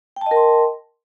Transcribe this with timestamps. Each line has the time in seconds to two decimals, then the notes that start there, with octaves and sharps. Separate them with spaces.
0.16 G5
0.21 A5
0.26 D#5
0.31 A#4
0.36 C6